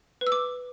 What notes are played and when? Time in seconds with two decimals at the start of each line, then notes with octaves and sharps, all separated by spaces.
0.21 B4
0.27 E6
0.32 D6